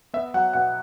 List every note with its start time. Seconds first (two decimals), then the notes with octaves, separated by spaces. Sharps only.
0.13 B3 E5
0.34 F#3 F#5
0.53 B2 F#5